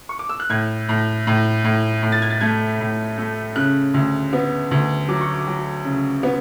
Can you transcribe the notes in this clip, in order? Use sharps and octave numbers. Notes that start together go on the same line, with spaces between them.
C#6
D6
E6
F#6
A2 G#6
A2
A2
A2
A2
A6
G#6
A6
A3 G#6
A2
A3
C#3 F#6
D2
B3
D2
F#3 D6
C#6
D6
F#3
C#3
B3